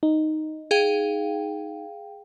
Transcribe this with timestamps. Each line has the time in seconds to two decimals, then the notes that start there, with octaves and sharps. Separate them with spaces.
0.03 D#4
0.71 G#4 F5 G5